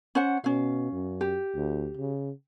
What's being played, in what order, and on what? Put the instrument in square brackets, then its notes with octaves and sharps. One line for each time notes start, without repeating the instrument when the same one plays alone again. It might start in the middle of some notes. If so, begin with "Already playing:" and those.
[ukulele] C#4 C5 F#5
[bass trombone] B2 [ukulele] C#4 F5
[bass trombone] F#2
[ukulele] G4
[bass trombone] D2
C#3